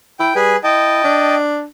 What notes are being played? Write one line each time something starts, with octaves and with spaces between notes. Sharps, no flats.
E4 G5
G3 G#4 B4 G#5
E4 D#5 G5 A5
D4